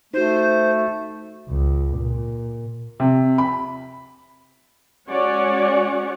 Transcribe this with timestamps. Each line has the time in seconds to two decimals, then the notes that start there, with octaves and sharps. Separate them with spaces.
0.14 A3 D#4 F#4 C5
1.49 C#2
1.98 A#2
3.00 C3
3.38 B5
5.09 G#3 C#4 F#4 C#5 D5 F#5